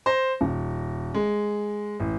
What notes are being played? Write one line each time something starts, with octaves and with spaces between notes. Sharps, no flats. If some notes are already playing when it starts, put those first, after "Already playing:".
C5 A#6
D#1
G#3
A1